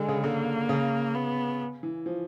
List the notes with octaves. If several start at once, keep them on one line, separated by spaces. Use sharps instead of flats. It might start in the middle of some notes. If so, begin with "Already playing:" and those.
Already playing: D3 G#3
C#3
D3 A#3
C#3
B3
E3
F3